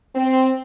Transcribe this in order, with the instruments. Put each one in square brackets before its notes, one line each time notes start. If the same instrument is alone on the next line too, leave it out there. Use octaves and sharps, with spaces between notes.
[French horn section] C4